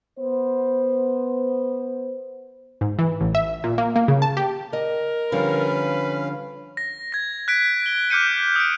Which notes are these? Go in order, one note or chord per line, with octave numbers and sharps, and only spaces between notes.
B3 C5
G#2
E3
A1
E5
A#2
A#3
A#3
C#3
A5
G4
A#4 D#5
D3 F3 G3 C#4 B4 F5
A#6
G#6 A#6
F#6 B6 D7
G7
D6 F6 G6 C#7 D#7
D#6 D7